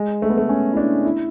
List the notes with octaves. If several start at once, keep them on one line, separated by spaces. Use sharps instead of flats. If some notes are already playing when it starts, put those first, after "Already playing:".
Already playing: G#3
A3
B3
A3
C#4
E4
D4
E4